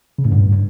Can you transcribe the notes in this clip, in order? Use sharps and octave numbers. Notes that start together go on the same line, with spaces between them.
C#3
A2
G2